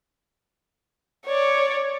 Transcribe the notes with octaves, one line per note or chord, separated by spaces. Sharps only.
C#5 D5